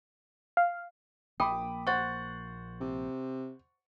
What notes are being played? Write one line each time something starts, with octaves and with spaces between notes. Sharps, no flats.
F5
A#1 A#3 G5 B5 D6 D#6
C5 F#5 C#6 F#6 A6
C3